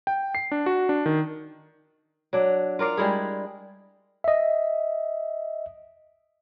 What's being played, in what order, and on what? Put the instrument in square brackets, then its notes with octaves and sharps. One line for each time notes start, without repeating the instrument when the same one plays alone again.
[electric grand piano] G5
C7
D4
F#4
D4
D#3
[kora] F#3 D4
F4 A#4 D5 F5
G3 G#3 E4 G#4
[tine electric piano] D#5 E5